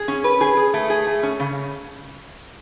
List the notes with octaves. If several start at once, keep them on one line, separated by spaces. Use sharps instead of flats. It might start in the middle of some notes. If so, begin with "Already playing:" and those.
Already playing: G#4
C#4
B4
G#4
G#4
A3
G#4
A3
C#4
C#3